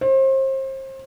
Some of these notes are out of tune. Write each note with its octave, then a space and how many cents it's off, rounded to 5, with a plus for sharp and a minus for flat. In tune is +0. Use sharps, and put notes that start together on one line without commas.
C5 +35